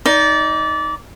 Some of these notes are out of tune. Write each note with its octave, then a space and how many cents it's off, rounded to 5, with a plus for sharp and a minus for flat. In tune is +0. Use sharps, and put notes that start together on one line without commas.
D#4 +10 D5 -20